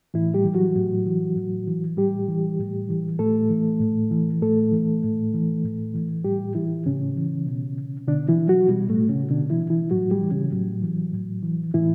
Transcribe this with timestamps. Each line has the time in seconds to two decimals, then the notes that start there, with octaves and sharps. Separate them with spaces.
0.14 A2 E3 E4
0.34 G3 G4
0.44 E3
0.55 F#3 F#4
0.75 A2
1.06 E3
1.36 A2
1.67 E3
1.97 A2 G3 G4
2.29 E3
2.59 A2
2.89 E3
3.19 A2 A3 A4
3.50 E3
3.80 A2
4.11 E3
4.42 A2 A3 A4
4.72 E3
5.03 A2
5.34 E3
5.64 A2
5.94 E3
6.24 A2 G3 G4
6.55 E3 E4
6.86 A2 C#3 C#4
7.17 E3
7.47 B2
8.08 B2 D3 D4
8.28 E3 E4
8.48 F#3 F#4
8.68 B2 G3
8.89 A2 A3
9.09 C#3 C#4
9.30 B2 D3 D4
9.50 E3 E4
9.70 E3 E4
9.91 A2 F#3 F#4
10.11 G3 G4
10.21 E3
10.31 C#3 C#4
10.52 A2 F#3
10.82 E3
11.13 A2
11.43 E3
11.74 A2 E3 E4